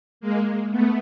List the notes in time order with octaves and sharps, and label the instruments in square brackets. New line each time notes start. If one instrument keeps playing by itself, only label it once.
[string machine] G#3 A#3
A3 B3